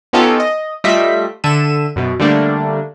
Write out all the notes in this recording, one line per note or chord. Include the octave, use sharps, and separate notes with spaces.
B3 C#4 D#4 F4 G4 A4
D#5
G3 A3 F4 D#5 E5 B6
D3 A4 E5 D#7 E7
F#2 B2
D3 G3 A3 A#3 D4